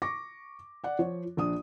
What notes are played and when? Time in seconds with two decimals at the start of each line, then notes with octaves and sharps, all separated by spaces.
0.02 C#6 D6 A#6
0.84 D5 F#5
0.99 F3 C#5
1.37 A#1 D4 D#6